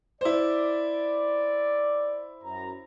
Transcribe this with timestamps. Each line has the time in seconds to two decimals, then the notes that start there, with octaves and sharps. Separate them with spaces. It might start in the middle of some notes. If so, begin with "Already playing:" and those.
0.21 E4 C5 D5
2.43 F#2 A#5